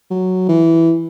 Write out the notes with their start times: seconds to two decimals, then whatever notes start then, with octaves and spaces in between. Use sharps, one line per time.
0.10 F#3
0.48 E3